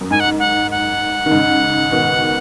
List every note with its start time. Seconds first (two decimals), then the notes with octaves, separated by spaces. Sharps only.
0.01 F#2
0.11 G#2 G#5
0.20 F#5
0.39 F#5
0.71 F#5
1.26 D#3
1.31 G#2 C#3
1.91 B2 D#3